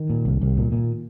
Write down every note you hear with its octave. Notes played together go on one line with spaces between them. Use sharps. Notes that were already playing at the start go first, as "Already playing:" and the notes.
Already playing: D#3
A#2
C2
C2
A#2
A#2